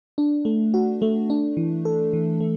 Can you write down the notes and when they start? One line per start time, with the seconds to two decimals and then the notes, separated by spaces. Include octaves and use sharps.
0.18 D4
0.45 A3
0.74 F#4
1.02 A3
1.30 D4
1.57 E3
1.85 A4
2.13 E3
2.40 A3